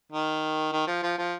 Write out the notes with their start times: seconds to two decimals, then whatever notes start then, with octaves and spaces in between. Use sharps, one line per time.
0.12 D#3
0.72 D#3
0.87 F3
1.03 F3
1.18 F3